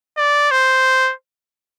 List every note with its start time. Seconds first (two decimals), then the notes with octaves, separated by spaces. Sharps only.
0.17 D5
0.51 C5